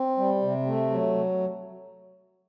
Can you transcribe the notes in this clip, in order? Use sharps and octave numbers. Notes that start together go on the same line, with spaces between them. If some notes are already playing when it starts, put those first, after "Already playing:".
Already playing: C4
G3
C3
A3
F#3